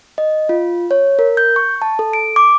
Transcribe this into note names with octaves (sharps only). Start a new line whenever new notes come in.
D#5
F4
C#5
A#4
G6
C#6
A5
A4
D7
D6